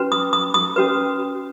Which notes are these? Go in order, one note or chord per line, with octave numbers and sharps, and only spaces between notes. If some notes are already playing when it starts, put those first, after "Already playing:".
Already playing: C#4 F#4 B4
D#6
D#6
D#6
C#4 F#4 B4